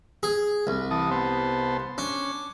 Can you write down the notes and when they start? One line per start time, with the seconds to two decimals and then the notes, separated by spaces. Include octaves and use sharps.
0.23 G#4
0.67 C2
0.91 E3 A5 D#6
1.11 B3 C5 A5
1.98 C#4 D4